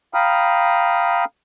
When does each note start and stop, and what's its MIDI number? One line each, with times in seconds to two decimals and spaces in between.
0.14 1.25 77
0.14 1.25 79
0.14 1.25 82
0.14 1.25 83
0.14 1.25 87
0.14 1.25 89